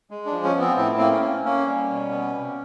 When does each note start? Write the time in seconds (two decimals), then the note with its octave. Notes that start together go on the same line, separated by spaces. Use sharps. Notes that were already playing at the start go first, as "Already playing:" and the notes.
0.11 G#3
0.26 D4
0.32 F3
0.44 C#4
0.55 B3
0.61 C4
0.77 A2 C4
0.98 A#3 C4
1.12 C#4
1.22 A#3
1.45 A#3 C#4
1.67 G3
1.90 B2
2.11 B3
2.34 C3